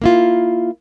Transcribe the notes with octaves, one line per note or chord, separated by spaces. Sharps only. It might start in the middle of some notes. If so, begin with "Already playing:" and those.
A#3 E4 F4